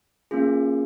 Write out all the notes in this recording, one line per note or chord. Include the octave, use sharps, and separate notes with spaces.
A#3 C#4 F4 G#4